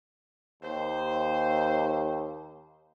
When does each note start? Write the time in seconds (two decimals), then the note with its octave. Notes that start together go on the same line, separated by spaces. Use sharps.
0.63 D#2 C5